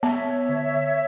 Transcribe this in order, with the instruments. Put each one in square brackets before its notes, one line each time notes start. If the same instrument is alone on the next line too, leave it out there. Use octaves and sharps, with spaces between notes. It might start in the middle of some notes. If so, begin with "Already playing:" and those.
[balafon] B3 [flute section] C#5 E5
[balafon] D3